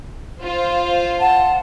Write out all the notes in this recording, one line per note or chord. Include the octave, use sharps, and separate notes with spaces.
F4 C5
F#5 A5